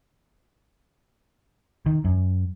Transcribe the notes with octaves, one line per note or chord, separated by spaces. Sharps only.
D#3
F#2